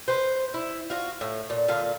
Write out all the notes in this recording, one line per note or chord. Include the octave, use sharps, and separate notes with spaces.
B4 C5
E4
F4 F#4
A2
A#2
A#2 D3 F5